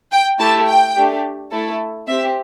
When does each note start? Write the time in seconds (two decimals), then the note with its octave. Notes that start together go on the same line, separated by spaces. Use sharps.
0.12 G5
0.39 A3 E4 G4 A5
0.67 G5
0.96 A3 D4 G4
1.52 A3 E4 A4
2.08 C4 G4 E5